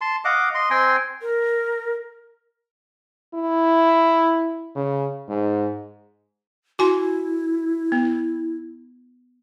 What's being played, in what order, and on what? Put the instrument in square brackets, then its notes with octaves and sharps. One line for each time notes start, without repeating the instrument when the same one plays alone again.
[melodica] A5 C6
D#5 F5 F#5 D6
D#5 C6
C4 G5 G#5 C6
[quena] A#4
[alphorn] E4
C#3
G#2
[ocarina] E4 [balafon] F#4 G#5 C6
[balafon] B3